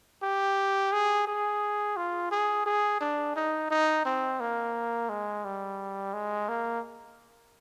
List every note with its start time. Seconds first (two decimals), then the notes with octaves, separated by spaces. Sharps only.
0.23 G4
0.92 G#4
1.27 G#4
1.97 F4
2.31 G#4
2.66 G#4
3.01 D4
3.36 D#4
3.70 D#4
4.05 C4
4.40 A#3
5.09 G#3
5.44 G3
6.13 G#3
6.49 A#3